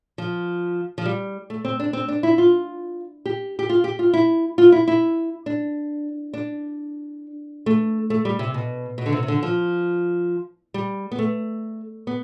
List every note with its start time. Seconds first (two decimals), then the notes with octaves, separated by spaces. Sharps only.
0.18 F3
0.98 F3
1.06 G3
1.50 A3
1.65 C4
1.80 D4
1.93 C4
2.08 D4
2.23 E4
2.38 F4
3.26 G4
3.59 G4
3.69 F4
3.84 G4
3.99 F4
4.13 E4
4.58 F4
4.72 E4
4.88 E4
5.46 D4
6.34 D4
7.66 A3
8.10 A3
8.25 G3
8.39 C3
8.54 B2
8.98 B2
9.06 D3
9.13 C3
9.23 C3
9.28 D3
9.43 F3
10.74 G3
11.12 B3
11.19 A3
12.07 B3